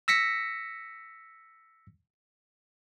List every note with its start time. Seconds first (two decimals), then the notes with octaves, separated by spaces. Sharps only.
0.08 E6 A#6 B6 C#7